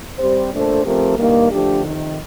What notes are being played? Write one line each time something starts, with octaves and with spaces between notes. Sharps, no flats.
G3 C4 G4 C5
A#2 A3 D4 A4 C5
F3 A3 C4 G4 A#4
G2 D#3 A#3
D3 F3 A3 D4 G4
F2 C3 D#3